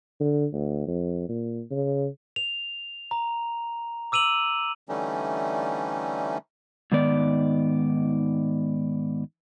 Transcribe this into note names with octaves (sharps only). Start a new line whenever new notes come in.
D3
D2
F2
A#2
C#3
F7
A#5
D6 E6 D#7 F7 F#7
D3 E3 G3 A3 C#4 D#4
G#2 D#3 B3 D5